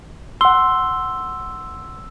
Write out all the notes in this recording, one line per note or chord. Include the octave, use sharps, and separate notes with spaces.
F#5 C6 E6 G7